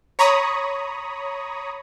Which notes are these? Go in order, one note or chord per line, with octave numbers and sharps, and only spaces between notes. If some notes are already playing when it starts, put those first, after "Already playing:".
C#5 A#5 B5 C#6 D#6